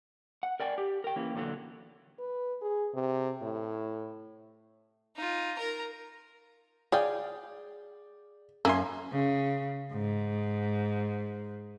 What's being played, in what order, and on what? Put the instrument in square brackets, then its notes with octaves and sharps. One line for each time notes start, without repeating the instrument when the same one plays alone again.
[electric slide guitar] F#5
A#4 D5 G5 G#5
G4
A#4 G5
E3 A#3 C#4
E2 A#2 D3 F#3
[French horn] B4
G#4
C3
A2
[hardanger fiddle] D#4 F4
A#4 A#5
[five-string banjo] G#4 F5 G5 [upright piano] D5
[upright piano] F#2 [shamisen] A#3 [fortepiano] E5 G#5 C6
[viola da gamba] C#3
G#2